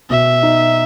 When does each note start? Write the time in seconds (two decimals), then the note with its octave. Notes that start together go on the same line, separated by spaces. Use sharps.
0.10 B2 E5
0.43 D#4